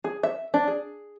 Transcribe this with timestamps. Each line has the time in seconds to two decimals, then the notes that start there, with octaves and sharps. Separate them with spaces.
0.04 G#4
0.23 E5
0.54 D4
0.68 G#4